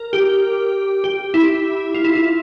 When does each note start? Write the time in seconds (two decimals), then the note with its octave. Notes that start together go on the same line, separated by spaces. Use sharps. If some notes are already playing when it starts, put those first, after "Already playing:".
Already playing: A#4
0.13 G4
1.04 G4
1.34 E4
1.94 F4
2.05 E4
2.15 E4